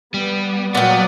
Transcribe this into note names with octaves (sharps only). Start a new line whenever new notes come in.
G3 B3
A#2 F#3 B3 D5 F#5 G5